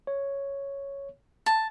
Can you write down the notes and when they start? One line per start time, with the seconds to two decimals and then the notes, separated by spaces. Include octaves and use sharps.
0.07 C#5
1.46 A5